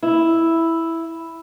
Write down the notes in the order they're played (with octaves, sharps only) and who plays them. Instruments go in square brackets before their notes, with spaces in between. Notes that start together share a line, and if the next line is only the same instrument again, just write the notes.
[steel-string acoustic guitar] E4